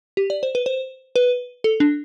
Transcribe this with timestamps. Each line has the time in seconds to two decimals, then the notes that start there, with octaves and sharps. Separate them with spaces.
0.17 G4
0.30 D5
0.43 C5
0.55 B4
0.66 C5
1.16 B4
1.64 A4
1.80 D4